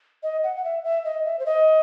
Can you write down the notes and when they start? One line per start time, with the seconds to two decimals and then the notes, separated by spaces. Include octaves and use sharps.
0.23 D#5
0.44 F#5
0.56 F#5
0.64 E5
0.84 E5
1.05 D#5
1.25 E5
1.39 C5
1.46 D#5